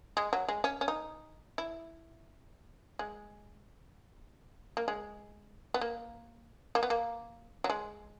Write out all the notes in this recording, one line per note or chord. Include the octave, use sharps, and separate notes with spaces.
G#3
F#3
G#3
C#4
C#4
D#4
E4
G#3
A#3
G#3
B3
A#3
A#3
B3
A#3
F#3
G#3